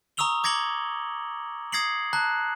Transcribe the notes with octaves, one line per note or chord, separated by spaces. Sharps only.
A#5 C#6 D#6 E6 F7 G7
D6 G#6 A#6 C#7 F#7 G7
D#6 G#6 A#6 C7 C#7 F#7
A5 A#5 F#6